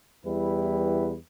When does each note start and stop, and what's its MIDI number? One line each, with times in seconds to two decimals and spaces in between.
0.25 1.16 40
0.25 1.16 55
0.25 1.16 64
0.25 1.16 71